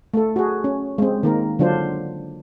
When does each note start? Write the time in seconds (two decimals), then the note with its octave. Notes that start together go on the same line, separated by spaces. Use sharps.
0.14 A3 A4
0.36 F#4 G#4
0.64 C#4
0.98 G#3 C4
1.23 D#3 A#3 A#4
1.59 D3 F#3 D4 F4 C5